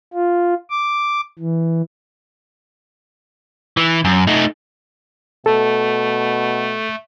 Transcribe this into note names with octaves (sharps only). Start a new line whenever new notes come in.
F4
D6
E3
E3
F#2
A3 D#4
B2 A3 A4